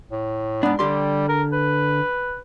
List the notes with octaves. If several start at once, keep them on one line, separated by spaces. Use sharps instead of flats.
A2
G#2 B3 D4
D3 G3 G4 C6
A#4
B4